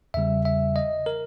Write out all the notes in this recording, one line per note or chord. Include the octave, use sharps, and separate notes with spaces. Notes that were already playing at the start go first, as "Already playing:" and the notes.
E2 C#3 G3 E5
E5
D#5
A#4